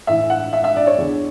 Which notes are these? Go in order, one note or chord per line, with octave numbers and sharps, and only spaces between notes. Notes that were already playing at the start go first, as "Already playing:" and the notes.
A2 E3 E5
F#5
E5
E5
D5
C#5
E2 D3